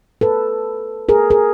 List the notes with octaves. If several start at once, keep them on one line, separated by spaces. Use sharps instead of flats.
A4 B4
G#4 A#4
G#4 A#4